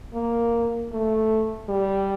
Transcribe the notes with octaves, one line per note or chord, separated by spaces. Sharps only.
A#3
A3
G3